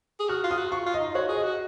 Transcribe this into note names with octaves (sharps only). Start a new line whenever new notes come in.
G#4
F#4 F6
F4
D#6
F#4
F4 C#6
F4
D#5
D#4
F#4 C#5
G#4
D#5
F#4